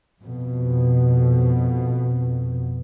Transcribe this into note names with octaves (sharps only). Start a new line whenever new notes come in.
F2 B2